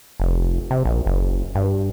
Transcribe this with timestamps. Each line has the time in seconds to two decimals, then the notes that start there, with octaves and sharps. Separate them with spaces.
0.20 F1
0.71 C3
0.85 A#1
1.06 F#1
1.55 G2